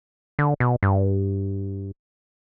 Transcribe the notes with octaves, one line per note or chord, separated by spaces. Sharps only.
D3
B2
G2